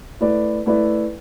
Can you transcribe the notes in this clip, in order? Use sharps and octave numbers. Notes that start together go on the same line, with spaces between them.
A3 E4 B4 D5
A3 E4 B4 D5